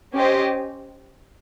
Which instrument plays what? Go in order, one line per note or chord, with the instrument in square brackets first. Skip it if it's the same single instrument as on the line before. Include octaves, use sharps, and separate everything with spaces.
[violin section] C#4 G4 C5 D#5